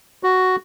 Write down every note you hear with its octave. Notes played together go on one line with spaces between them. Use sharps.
F#4